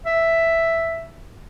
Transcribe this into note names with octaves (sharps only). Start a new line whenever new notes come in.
E5